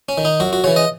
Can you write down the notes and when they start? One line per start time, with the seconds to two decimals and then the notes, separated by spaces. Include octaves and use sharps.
0.09 C#4
0.18 D#3
0.25 D#4
0.40 F#2 F#4
0.53 F#4
0.64 C#3 E3 C#5
0.76 D#5